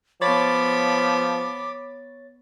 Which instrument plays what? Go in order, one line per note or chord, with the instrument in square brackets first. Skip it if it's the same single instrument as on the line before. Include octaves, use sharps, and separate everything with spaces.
[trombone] F3 [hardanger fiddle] B3 B5 [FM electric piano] C#5 A6 [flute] D6